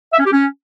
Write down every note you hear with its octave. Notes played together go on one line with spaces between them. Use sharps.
E5
C#4
G4
C#4